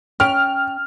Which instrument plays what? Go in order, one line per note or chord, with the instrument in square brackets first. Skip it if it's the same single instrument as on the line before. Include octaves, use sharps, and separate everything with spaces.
[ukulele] C#4 G5 [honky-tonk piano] F6